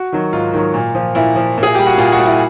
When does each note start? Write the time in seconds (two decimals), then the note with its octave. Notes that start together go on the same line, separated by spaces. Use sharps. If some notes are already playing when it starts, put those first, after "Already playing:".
Already playing: F#4
0.12 D#3 F#3
0.33 G#2 F4
0.53 D#3 F#3
0.74 A#2
0.95 F3
1.15 A#2 E4
1.36 F3
1.57 A#2
1.63 G#4
1.75 G3 G4
1.86 F#4
1.98 A#2 F4
2.12 F#4
2.19 G3
2.26 E4